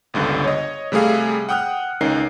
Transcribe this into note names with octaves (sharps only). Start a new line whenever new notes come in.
G1 C#2 G2 D3
C#5 D#5
C3 G3 A3 G#4 F5
F#5 G5 D#6 F6 F#6
C#2 C#4 D#4 A#4 C7